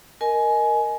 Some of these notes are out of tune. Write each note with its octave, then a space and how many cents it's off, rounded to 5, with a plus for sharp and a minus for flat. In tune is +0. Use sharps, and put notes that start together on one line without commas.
A#4 +0 D#5 +0 G#5 +20